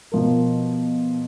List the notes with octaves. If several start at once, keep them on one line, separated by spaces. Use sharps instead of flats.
B2 F3 A#4